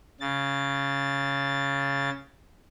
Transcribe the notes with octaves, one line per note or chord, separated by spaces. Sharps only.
C#3 A6